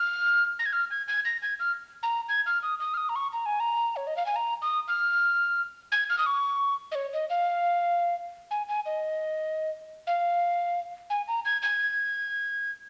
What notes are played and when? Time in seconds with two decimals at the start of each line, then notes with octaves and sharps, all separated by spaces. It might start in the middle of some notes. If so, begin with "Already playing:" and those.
Already playing: F6
0.59 A#6
0.66 G#6
0.73 F6
0.91 G#6
1.08 G#6
1.25 A#6
1.42 G#6
1.60 F6
2.03 A#5
2.29 G#6
2.46 F6
2.63 D#6
2.80 D#6
2.94 F6
2.97 D#6
3.09 A#5
3.16 C#6
3.33 A#5
3.46 G#5
3.60 A#5
3.96 C#5
4.07 D#5
4.17 F5
4.26 G#5
4.36 A#5
4.62 D#6
4.88 F6
5.92 G#6
6.10 F6
6.18 D#6
6.26 C#6
6.92 D#5
6.95 C#5
7.13 D#5
7.30 F5
8.51 G#5
8.68 G#5
8.86 D#5
10.07 F5
11.10 G#5
11.28 A#5
11.45 G#6
11.62 G#6